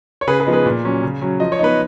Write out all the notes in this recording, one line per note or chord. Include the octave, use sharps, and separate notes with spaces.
C#5
C#3 G#4 B4
G#4 B4
F3 B3 D#4
G#4 B4
A#2
F#3 C#4
C#3
F#3 C#4
F3 D#5
C#5
B3 D#4 B4